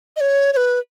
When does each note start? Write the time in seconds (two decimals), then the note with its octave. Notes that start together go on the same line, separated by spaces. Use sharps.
0.16 D#5
0.21 C#5
0.53 C#5
0.57 B4